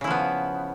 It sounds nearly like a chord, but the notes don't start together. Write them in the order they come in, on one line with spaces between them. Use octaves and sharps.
C#3 E4 F3 B3